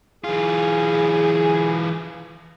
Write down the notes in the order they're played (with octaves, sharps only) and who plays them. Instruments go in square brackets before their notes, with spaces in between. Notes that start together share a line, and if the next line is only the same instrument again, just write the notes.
[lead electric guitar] E3 F4 [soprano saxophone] G#4